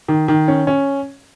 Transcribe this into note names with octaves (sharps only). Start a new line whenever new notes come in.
D#3
D#3
C#4
C#4